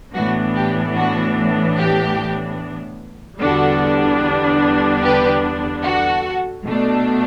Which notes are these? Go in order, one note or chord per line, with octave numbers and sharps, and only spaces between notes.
A2 E3 B3 D4 F#4
G4
F#4
G4
E2 D3 G3 B3 D4 F#4 A4
G4 B4
F#4 A4
B2 A3 D4